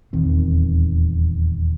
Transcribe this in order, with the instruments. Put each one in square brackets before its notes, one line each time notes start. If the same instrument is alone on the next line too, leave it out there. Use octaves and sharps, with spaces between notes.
[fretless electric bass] D#1 E2 D#3 C4